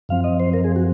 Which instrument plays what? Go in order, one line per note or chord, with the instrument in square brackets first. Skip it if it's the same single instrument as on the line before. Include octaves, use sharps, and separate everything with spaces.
[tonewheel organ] F#2 F3 C4 F5
D#5
C5
A#4
G#4
F#4